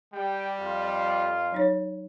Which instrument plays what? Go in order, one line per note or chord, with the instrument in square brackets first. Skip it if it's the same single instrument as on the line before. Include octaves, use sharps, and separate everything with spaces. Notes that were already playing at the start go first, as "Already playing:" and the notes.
[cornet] G3 [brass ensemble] G4 G5
[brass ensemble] F2 F4
[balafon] F#3 D#4 C#5